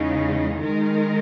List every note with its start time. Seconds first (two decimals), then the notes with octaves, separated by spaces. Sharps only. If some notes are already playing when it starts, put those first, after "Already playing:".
Already playing: E2 C#3 G#3 D#4
0.64 D#3 G#3 D#4 A#4